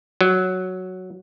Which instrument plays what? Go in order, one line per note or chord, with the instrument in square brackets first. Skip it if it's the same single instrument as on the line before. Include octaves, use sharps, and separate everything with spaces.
[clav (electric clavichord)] F#3